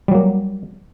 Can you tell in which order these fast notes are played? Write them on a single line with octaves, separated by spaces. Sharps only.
G3 F#3 A#3